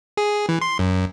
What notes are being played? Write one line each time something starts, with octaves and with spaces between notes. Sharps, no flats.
G#4
E3
C6
F#2